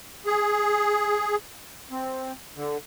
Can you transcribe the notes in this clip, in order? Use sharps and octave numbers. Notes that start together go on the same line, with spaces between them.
G#4
C4
D3